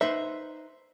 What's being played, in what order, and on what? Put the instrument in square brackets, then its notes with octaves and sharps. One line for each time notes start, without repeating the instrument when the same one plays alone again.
[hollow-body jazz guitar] D#4 B4 C5 [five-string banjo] E5